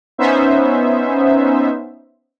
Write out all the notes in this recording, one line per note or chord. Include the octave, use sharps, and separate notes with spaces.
B3 C#4 D#4 C5 E5